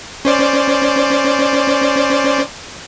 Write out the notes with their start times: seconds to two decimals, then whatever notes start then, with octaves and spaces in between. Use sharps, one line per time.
0.25 C#4 C5 D5